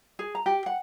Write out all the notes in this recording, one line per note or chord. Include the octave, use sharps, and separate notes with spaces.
G#4
A#5
G4
F#5